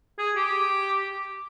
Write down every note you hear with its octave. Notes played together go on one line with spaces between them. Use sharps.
G#4
G4